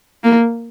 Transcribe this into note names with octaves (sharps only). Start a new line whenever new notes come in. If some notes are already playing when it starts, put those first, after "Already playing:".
A#3